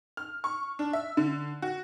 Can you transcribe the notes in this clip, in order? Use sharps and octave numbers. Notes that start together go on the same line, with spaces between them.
F6
C#6
D4
E5
D3
F#4